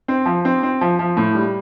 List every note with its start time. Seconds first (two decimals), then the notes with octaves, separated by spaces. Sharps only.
0.08 C4
0.26 F3
0.45 C4
0.63 C4
0.81 F3
0.99 F3
1.17 A2
1.35 G3